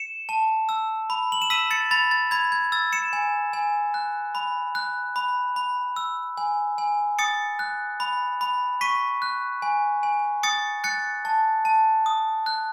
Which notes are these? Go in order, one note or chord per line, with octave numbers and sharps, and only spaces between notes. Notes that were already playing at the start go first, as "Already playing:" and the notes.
Already playing: C#7 E7
A5
E6
B5
F#7
E7
E6 B6 D#7
A6 C#7
B5 A6
A6
B5 G#6
G#6
E6 A6
C#7 E7
G#5
G#5
F#6
B5
F#6
B5
B5
E6
G#5
G#5
D#6 A6 C#7
F#6
B5
B5
C#6 B6 D#7
F#6
G#5
G#5
D#6 A6 C#7
F#6 A6 C#7
A5
A5
D#6
F#6